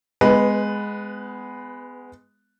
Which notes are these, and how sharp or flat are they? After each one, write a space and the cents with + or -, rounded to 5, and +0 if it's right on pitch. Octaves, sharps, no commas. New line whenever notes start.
G#3 +0 B3 +25 B4 +0